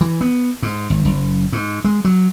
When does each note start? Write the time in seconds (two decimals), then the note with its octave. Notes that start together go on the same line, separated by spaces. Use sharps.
0.01 E3
0.21 B3
0.63 G#2
0.90 G#1
1.05 F#1
1.53 G#2
1.84 G#3
2.05 F#3